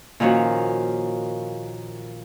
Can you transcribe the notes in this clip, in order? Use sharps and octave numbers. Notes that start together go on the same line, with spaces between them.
A#2 D#3 F3 C#4 F#4